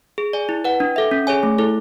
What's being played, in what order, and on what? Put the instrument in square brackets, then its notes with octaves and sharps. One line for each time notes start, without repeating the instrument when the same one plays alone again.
[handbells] G#4
D5 G#5
E4
B4 F#5
D4
A4 E5
C#4
G#4 C#5 G#5
A3
E4 A4